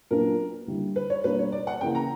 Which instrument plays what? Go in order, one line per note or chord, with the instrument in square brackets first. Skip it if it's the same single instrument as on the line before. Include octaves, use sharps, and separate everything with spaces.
[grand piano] A#2 F#3 B3 D4 [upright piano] A#4
[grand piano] D3 G3 A#3 E4
[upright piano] B4
C#5
[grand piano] B2 G3 A#3 D4 [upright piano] B4
[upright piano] C#5
D5
F#5
[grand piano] C#3 E3 A#3 [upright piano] G5
[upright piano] A#5